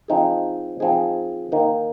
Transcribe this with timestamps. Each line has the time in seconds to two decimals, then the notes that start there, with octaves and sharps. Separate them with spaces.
0.08 F3 C4 D#4 G#4
0.80 F3 C4 D#4 G#4
1.52 D#3 A#3 D#4